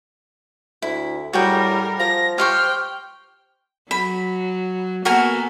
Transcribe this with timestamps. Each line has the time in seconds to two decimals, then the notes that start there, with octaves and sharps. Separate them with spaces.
0.82 D2 E4
1.33 A2 G3 F#4 G#4 A#4 G5
1.99 F3 A#6
2.38 G4 C5 G5 C#6 F6
3.91 F#3 B5
5.05 A#3 B3 F#4 A4 A#4 G#5